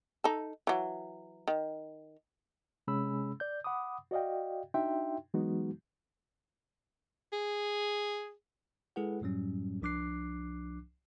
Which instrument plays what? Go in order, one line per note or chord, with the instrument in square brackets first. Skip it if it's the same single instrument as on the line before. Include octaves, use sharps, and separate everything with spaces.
[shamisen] D#4 A4
E3 F#3
D#3
[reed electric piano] C3 G#3 C#4 G#4 B5 E6
D5 G6
F#5 B5 D6 D#6
F#4 D5 D#5 F5 G5
D4 D#4 F#4 E5 G5 C6
E3 F#3 G#3 B3 D#4 F#4
[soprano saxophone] G#4
[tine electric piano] G#3 E4 G#4 A4 B4 F#5
F#2 A2 F#3 G3 C#4
C2 F3 D4 D6 F#6 C7